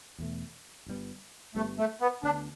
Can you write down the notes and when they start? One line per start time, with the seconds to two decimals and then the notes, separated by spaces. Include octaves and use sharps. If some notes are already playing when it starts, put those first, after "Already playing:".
0.18 E2 B2 A3
0.86 G1 G2 G3 B3
1.55 G1 G2 G3 A3 B3
1.78 A3
2.01 B3
2.23 D2 D3 B3 D4